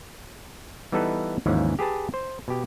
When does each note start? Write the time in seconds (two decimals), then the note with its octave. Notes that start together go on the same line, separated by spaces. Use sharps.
0.92 E3 G3 B3 D#4 A4 B4
1.46 D#2 G#2 E3 F3 C#4
1.79 G4 G#4 B4 A5
2.14 C5
2.48 B2 G4